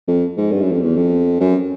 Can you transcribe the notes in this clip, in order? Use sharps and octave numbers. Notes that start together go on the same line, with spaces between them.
F2
G#2
G2
F#2
F2
E2
F2
F#2